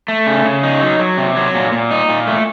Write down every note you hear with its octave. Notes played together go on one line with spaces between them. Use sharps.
A3
C#3
C#3
D#4
F#3
F#3
C3
F#3
A#2
A#2
D#4
A#2
A3